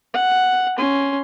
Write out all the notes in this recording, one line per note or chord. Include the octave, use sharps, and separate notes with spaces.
F#5
C#4 C6